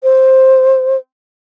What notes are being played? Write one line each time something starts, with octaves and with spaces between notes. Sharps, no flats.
C5